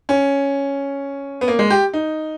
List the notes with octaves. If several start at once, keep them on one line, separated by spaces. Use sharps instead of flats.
C#4
B3
A#3
G#3
G4
D#4